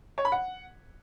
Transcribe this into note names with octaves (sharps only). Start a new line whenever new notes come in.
C#5
B5
F#5